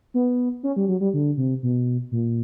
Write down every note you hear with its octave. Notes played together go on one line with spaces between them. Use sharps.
B3
C#4
G3
F#3
G3
D3
C3
B2
A#2